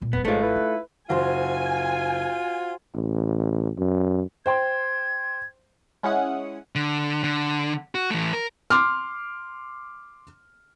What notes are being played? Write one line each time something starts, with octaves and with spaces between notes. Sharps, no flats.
A#2 B3
E1 G3 B3
G#1 C#2 G#2 G#3 A3 F4
E4 B4
D#4
F#1 F4 F#4 C5 G#5
A1
F#2
C5 G5 C6 G#6
G#3 C#4 E4 F#5 D#6 C#7
D3
D3
F#4
E3 A3
A#4
C6 D6 F6